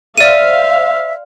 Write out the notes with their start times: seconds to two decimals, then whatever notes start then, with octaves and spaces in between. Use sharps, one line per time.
0.18 C5 D5 E5 F5 D#7